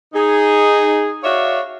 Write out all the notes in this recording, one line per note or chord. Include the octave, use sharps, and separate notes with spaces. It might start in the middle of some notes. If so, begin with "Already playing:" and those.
D#4 G#4
F#4 C#5 D5 E5 F5